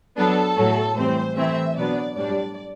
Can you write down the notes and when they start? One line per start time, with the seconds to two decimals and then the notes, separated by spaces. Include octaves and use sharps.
0.16 F#3 B3 D4 A4
0.56 A2 F#3 A3
0.96 A2 E3 G3 C4 C5
1.36 E3 A3 C4 E4 E5
1.76 B2 F#3 B3 D4 D5
2.16 A2 G3 D4 D5